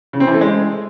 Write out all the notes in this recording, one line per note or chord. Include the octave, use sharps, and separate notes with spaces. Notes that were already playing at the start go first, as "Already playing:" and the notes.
C#3
C4
E3
A3
G#3